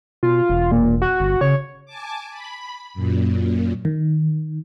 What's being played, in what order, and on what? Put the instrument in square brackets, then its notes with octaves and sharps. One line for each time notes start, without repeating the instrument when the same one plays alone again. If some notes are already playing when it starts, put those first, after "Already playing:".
[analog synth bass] B2 [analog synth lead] F4
[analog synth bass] E1
[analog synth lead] A#2
F#4
[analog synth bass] G1
[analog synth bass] C#3 [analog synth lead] C#5
[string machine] G#5 A5 D6
B5
F#2 A#2
[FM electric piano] D#3